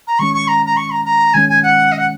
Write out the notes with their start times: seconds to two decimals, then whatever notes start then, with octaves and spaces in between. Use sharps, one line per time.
0.07 A#5
0.19 D#3 G#3 C#4 C#6
0.34 C#6
0.48 A#5
0.66 A#5
0.77 C#6
0.91 A#5
1.05 A#5
1.34 D#3 G#3 C#4 G#5
1.49 G#5
1.63 F#5
1.92 D#5
1.98 F#5